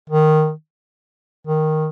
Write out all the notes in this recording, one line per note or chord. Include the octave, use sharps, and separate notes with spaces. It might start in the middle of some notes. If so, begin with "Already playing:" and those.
D#3
D#3